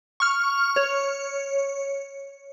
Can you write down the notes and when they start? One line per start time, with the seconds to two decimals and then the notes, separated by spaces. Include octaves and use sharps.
0.20 C#6 F6
0.76 C#5